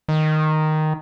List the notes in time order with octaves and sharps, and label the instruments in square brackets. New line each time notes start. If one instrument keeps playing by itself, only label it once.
[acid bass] D#3